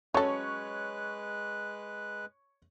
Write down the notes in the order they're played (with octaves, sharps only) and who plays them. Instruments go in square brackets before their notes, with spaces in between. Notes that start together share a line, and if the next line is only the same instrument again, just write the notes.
[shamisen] F#3 A4 [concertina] G#3 B4 F#6 [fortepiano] C#4 [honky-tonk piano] C#5 C#6